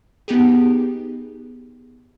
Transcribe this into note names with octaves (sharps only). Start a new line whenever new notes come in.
B3 D#4 G4 G#4